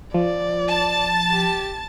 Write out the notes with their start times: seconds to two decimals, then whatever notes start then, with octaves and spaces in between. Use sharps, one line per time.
0.14 F3 D5
0.68 A5 A6
1.31 G4